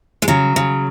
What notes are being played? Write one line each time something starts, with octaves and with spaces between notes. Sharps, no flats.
G#3
C#3 F#3
C#3